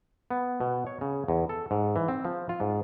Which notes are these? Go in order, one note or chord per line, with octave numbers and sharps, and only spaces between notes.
B3
B2
C#5
C#3
E2
A4
G#2
E3
C4
F3
F4
G#2